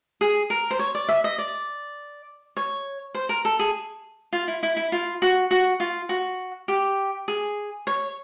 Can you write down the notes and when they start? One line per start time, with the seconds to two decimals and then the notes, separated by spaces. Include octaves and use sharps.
0.21 G#4
0.50 A#4
0.71 C5
0.79 C#5
0.95 D5
1.09 E5
1.24 D#5
1.38 D5
2.57 C#5
3.15 C5
3.29 A#4
3.45 A4
3.59 G#4
4.33 F4
4.48 E4
4.63 E4
4.77 E4
4.92 F4
5.22 F#4
5.51 F#4
5.80 F4
6.09 F#4
6.68 G4
7.28 G#4
7.87 C#5